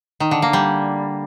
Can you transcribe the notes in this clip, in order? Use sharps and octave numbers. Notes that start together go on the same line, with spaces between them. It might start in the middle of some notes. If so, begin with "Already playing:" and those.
D#3
D3
A#3
G3